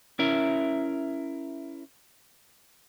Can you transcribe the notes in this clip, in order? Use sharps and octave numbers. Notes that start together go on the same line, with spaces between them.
C#4 E4 A#4 E5